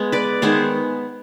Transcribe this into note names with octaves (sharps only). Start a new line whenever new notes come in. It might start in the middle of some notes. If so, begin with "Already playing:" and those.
Already playing: G#3 B3
B4 D5
D#3 G#3 B3 G#4 C5